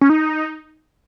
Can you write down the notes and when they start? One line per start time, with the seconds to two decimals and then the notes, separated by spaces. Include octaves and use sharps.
0.01 C#4
0.10 D#4